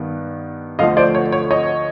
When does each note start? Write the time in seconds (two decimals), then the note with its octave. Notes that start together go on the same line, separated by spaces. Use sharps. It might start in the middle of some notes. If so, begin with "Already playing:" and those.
Already playing: G2 D#3 B3
0.79 D2 D3 F3 A3 D#5 F5
0.97 C5 D5
1.15 C#5
1.32 C#5
1.51 C#5 D#5